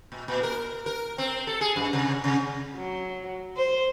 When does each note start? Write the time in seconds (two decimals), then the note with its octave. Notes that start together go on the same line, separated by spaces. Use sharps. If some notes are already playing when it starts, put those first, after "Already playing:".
0.12 A#2
0.28 A#2
0.43 A#4
0.86 A#4
1.18 C4
1.47 A4
1.61 G#4
1.76 F#2
1.93 C3
2.24 C3
2.76 F#3
3.56 C5